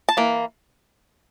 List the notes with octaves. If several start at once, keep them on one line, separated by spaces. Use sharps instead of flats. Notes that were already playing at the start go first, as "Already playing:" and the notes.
A5
E3 A#3